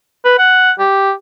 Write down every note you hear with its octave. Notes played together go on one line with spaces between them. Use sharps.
B4
F#5
G4